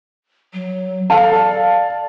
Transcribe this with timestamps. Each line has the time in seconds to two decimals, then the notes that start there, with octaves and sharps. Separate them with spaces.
0.53 F#3
1.10 A4 F5 A5
1.34 D5